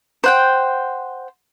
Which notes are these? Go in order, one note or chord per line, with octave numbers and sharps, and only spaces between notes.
C5 F#5 G5